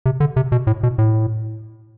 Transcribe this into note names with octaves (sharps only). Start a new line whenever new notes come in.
C3
D3
C3
B2
A2
B2
A2